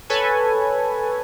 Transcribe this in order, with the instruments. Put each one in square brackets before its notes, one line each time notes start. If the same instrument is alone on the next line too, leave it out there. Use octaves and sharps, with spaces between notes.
[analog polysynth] A4 B4 C#5 G#5